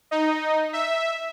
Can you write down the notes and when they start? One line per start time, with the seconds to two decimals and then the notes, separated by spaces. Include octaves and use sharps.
0.11 D#4
0.73 E5